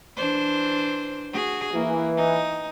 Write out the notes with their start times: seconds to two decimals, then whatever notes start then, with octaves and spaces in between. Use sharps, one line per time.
0.17 E3 D4 C5
1.32 F#4 G#4
1.73 E3 A#3
2.17 D#4